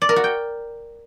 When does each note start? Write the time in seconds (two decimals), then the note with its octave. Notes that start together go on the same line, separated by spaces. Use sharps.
0.02 D5
0.09 A#4
0.16 F#4
0.24 G5